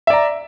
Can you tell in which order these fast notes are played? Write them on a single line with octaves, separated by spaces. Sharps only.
E5 D5 A#5